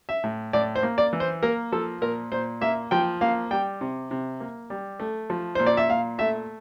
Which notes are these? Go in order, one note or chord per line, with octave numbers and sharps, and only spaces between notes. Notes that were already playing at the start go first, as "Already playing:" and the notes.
E5
A2
A2 D5
C5
A#3
D5
E3
C5
A#3 A#4
F3 A4
A#2 A#4
A#2 C5
A#3 E5
F3 G5
A#3 F5
G3 G5
C3
C3
A#3
G3
A3
F3
A#2 C5
D5
E5
A#2 F5
A3 E5